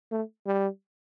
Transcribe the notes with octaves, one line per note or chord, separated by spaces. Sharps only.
A3
G3